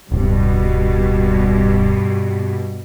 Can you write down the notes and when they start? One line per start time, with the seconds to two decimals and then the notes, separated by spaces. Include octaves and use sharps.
0.12 D1 G2 B2